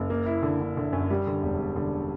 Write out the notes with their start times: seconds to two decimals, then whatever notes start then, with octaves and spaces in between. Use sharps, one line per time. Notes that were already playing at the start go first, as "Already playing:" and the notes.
Already playing: F#1
0.10 A#3
0.26 E4
0.43 D3
0.60 D3
0.77 D3
0.93 F#2
1.10 G3
1.27 D3
1.43 E1
1.59 E1
1.76 D3